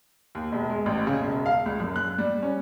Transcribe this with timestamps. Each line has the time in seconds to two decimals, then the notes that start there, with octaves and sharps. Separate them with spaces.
0.35 D#2
0.52 E1
0.70 G#3
0.86 A1
1.07 C#3
1.21 E1
1.46 F5
1.66 C#2
1.80 F#2
1.96 F#6
2.18 G3
2.43 C#4